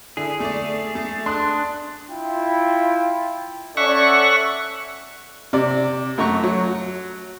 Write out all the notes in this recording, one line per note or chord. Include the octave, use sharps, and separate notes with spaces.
D3 E4 G#4
A3 D5
A3 A6
D4 C6 D#6 F#6
E4 F4 G5
C#4 A4 D5 E5 F#5 C#6
C3 D5
F#2 A3 A#5 C#6
F#3